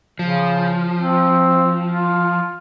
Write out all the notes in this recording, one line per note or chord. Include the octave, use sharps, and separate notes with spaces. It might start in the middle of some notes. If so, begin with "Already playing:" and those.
C#3 F3
C4
F4